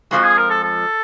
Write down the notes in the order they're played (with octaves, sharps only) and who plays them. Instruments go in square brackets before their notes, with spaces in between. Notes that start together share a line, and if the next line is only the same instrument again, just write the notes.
[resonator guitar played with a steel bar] F2 C#3 F3 G#3 [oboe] F#4
[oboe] G#4
A#4
A4
A4